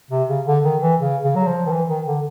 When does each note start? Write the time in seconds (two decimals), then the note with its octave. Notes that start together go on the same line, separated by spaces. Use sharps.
0.11 C3
0.29 C#3
0.46 D3
0.64 D#3
0.82 E3
1.00 C#3
1.23 C#3
1.35 F#3
1.46 F3
1.66 D#3
1.71 E3
1.88 D#3
2.06 D3